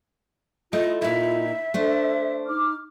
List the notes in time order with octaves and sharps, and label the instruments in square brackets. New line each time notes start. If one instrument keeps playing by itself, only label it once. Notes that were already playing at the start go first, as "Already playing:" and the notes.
[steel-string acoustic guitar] A3 [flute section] E4 F4 [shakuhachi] D#5
[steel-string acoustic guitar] A#2 D#4 [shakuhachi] E5
[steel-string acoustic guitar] A3 D4 C5 [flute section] A4
[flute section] D#4 D6 F6